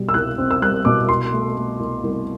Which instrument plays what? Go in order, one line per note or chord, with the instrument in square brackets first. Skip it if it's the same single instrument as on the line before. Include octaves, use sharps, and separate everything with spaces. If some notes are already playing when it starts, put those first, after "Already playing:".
Already playing: [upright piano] B2 G3
E6
C2 F#6
C4
E6
G3 F#6
B2 D6
C2 C6
A3
A3
C2
C2